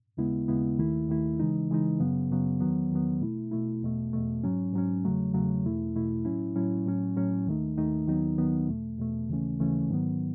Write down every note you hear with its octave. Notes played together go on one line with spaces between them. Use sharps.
D#2 C#3 G#3 B3 E4
D#2 C#3 G#3 B3 E4
D#2 D#3 A3 E4
D#2 D#3 A3 E4
C#3 E3 G#3 D#4
C#3 E3 G#3 D#4
F#2 C#3 F#3 B3
F#2 C#3 F#3 B3
E2 D#3 F#3 B3
E2 D#3 F#3 B3
B2 A3 E4
B2 A3 E4
E2 B2 A3
E2 B2 A3
G#2 F#3 C#4
G#2 F#3 C#4
E2 C#3 F#3 A3
E2 C#3 F#3 A3
E2 B2 A3 E4
E2 B2 A3 E4
A2 F#3 C#4 E4
A2 F#3 C#4 E4
A2 F#3 C#4
A2 F#3 C#4
D#2 D#3 A3 D#4
D#2 D#3 A3 D#4
D#2 D#3 F#3 B3 D#4
D#2 D#3 F#3 B3 D#4
E2 B2 A3
E2 B2 A3
D#2 C#3 E3 A3 C#4
D#2 C#3 E3 A3 C#4
G#2 D#3 F#3 B3